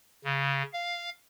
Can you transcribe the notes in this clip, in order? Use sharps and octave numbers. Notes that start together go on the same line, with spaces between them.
C#3
F5